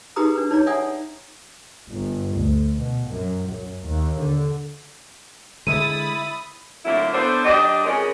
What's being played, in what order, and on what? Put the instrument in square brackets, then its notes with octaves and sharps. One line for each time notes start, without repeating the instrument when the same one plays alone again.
[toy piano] D#4 G4 G#4 B4 A#5 D#6
D4 B4
D#4 C#5 D5 A#5
C#5 D5 E5 F#5 G#5 D#6
[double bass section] G1
D2
B2
F#2
F#2
D#2
D3
[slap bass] D3 G#3 [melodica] E4 [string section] B5 D#6 A6 [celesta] D#7
[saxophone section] F2 D3 F#3 A3 A#3 E4
B3 D4 A4 C5
F#3 D4 G4 D5 D#5
F2 C#3 G#3 C#4 G#4 A#4